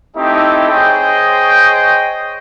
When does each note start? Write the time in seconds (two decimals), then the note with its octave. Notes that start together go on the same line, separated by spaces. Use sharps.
0.16 A3 C4 D#4 E4 G4 A4
0.70 G#4 C5 C#5 D#5 G5